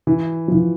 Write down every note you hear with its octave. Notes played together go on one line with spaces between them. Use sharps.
E3
F3
E3